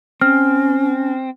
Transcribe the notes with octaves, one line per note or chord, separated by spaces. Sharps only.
C4 C#4 F6